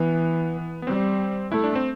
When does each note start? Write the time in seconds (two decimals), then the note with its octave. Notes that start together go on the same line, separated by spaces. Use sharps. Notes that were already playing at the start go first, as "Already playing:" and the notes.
Already playing: E3 B3
0.82 B3
0.87 G3 C4
1.51 A3 E4
1.64 D4
1.75 C4